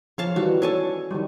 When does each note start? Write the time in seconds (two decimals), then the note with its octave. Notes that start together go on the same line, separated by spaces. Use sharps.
0.18 F3 C#5 F5 A5
0.36 D#3 E3 G3 F#4
0.62 C#4 A4 C#5 G#5 A5
1.11 D#3 G3